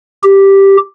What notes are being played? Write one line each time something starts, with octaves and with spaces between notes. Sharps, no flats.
G4